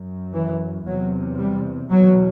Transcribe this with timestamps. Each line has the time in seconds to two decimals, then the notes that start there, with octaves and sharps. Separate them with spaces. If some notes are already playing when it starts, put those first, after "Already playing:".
Already playing: F#2
0.33 E3
0.85 E2 C3 F#3
1.37 G3
1.89 E2 B2 F#3